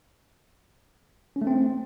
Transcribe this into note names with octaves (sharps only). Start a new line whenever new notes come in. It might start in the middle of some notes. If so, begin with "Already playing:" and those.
C#4
A3
C4